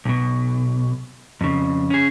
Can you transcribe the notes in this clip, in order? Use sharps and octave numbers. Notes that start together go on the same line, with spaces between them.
B1 B2
F2 C#3
C#4 G#4